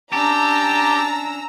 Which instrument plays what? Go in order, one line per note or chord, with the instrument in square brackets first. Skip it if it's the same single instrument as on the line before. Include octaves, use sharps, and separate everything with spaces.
[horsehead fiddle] C#4 D4 [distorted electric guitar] G4 [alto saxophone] A5 [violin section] A#5 E6